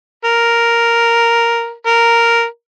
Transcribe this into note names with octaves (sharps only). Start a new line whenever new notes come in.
A#4
A#4